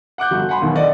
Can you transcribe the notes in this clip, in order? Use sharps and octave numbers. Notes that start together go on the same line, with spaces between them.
F#5 D6 F#6 G6
G1 F#4
F#5 G#5 B5 C6
D#2 B2 D#3 E3 F#3
C4 A4 D5 D#5 F#5